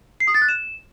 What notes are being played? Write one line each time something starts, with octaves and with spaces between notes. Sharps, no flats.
C7
D#6
A6
F#6
E7